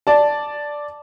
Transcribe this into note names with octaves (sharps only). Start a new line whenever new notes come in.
D5 A5